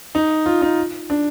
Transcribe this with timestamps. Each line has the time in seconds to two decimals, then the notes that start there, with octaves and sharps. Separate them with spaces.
0.15 D#4
0.46 F4
0.62 D#4
1.10 D4